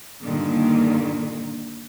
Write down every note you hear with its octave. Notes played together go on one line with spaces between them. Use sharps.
G2 A#2 D3 D#3